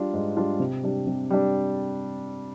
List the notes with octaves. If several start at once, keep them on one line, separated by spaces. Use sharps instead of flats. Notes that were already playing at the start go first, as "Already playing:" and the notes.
Already playing: G3 D4 F4
G#2
G3 D4 F4
C3
G3 D4
C3
G3 D4